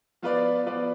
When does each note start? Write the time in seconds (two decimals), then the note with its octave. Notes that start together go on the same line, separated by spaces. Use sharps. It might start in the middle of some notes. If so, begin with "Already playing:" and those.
0.23 F3 B3 F4 B4 D5
0.66 F3 B3 F4 B4 D5